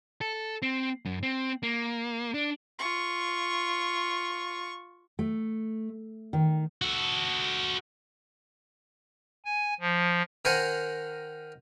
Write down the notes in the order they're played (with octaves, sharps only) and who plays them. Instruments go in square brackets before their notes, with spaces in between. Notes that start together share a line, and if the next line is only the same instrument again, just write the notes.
[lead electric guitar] A4
C4
F#2
C4
A#3
D4
[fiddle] F4 C#6
[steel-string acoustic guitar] A3
D#3
[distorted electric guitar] F#4 A4
[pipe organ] G#5
F3
[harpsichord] D#3 A#4 C5 F#5 G#5